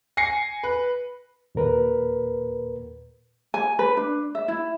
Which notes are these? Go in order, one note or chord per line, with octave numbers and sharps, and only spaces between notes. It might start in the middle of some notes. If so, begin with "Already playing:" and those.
G#5 A#6 C7 C#7
B4
D#2 A#2 A#4 B4
G#5
B4
D4
E5
E4